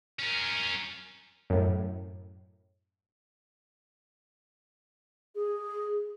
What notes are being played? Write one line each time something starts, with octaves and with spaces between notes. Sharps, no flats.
C#4 A#4
F#2 A2
G#4